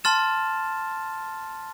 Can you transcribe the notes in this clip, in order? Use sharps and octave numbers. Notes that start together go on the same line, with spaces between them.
A5 C6 F6 A6 E7